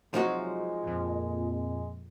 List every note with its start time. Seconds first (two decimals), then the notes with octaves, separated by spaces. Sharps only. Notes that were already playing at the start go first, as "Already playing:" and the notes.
0.14 C3 F3 F#3 G#3 D#4 F#4
0.83 F2 A#2
1.52 G#3